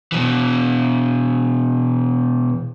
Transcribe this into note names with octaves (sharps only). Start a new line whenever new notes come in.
B2 E3